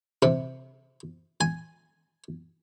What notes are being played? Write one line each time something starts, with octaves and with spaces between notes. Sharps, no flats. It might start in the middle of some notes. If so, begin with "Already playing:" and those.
C3
G#5